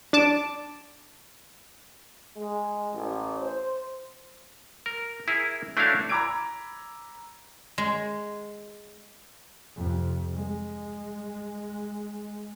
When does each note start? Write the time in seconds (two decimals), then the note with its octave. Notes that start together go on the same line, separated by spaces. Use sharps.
0.13 D4 A5 D6
2.37 G#3
2.94 A1
3.41 C5
4.86 A#4
5.28 E4 G#4 A#4
5.77 A3 D4 E4 F#4 C#5 F5
6.09 A#5 B5 D6 E6 G#6 D7
7.78 G#3
9.77 F2 C3
10.34 G#3